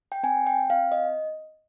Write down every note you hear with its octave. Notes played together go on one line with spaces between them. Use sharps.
G5
C4 G#5
G5
C4 F5
D#5